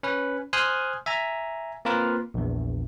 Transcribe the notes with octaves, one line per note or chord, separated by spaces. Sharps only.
C#4 B4
C5 G#5 C6 D#6 F6 F#6
E5 G#5 A#5
A#3 C4 F4 A#4 B4
A#1 E2